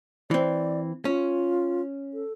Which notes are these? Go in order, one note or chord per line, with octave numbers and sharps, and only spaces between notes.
E3 C4 D5
C#4 F4
A4